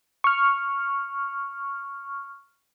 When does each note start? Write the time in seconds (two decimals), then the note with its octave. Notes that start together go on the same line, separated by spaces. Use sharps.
0.24 C#6 F6